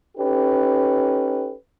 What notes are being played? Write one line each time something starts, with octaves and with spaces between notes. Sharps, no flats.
C#4 D#4 G4 A4 B4